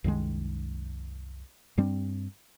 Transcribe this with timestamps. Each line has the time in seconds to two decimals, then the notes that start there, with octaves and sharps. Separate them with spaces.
0.04 C2 F#2 D#3 G#3
1.78 G2 G3 C4 D4